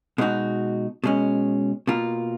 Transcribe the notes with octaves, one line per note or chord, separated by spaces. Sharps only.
B2 G#3 D#4 F#4
B2 G#3 C#4
B2 A#3 F4